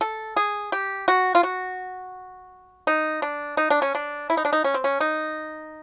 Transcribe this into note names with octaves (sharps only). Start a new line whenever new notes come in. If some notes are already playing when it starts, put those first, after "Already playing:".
A4
G#4
G4
F#4
F4
F#4
D#4
D4
D#4
D4
C#4
D4
E4
D#4
D4
D#4
C#4
C4
C#4
D#4